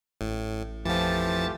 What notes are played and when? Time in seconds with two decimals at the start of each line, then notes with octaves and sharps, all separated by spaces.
0.21 A1 A2
0.85 F2 E3 F3 A3 F4 G4 A5 A6